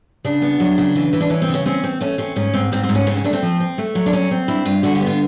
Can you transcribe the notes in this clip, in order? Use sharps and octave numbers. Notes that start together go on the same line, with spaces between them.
C#3 D4
B3
F#3
C#3
E3
E3
D4
E3 C#4
C4
C#3
C#4
C4 C#4
C4
A3 C#4
C4 C#4
G#2 C#4
G#2 C4
G#2 C4
C4
G#2
C#4
C#3 C4
C#4
A3 D4
C4
F3
C4
A3
F#3
D4
C4 C#4
C4
G2 E4
G2 F4
D3 F#4
G4
B3
F4